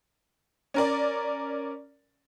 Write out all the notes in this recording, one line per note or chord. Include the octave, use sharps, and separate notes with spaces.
C#4 A#4 D5